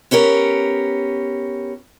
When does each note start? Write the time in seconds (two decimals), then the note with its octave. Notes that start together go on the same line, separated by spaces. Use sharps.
0.11 B3 C#4 G4 A#4